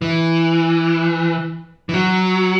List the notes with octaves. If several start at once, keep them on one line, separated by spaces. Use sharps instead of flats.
E3
E3
F#3